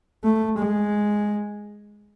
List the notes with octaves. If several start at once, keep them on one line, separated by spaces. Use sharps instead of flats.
A3
G#3